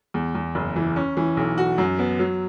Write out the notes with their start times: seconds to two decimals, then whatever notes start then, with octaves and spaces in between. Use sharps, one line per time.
0.14 E2
0.35 E2
0.55 F#1
0.76 E3
0.96 C#4
1.17 E3
1.37 B1
1.58 F#4
1.78 F#2
1.99 B3
2.19 F#3